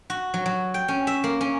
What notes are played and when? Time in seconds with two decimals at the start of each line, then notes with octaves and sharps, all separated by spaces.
0.10 F#4
0.34 F#3
0.46 F#3
0.74 G5
0.88 C#4
1.07 E5
1.24 A#3
1.41 C#4